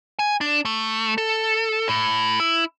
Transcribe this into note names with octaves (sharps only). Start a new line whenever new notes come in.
G#5
D4
A3
A4
A2
E4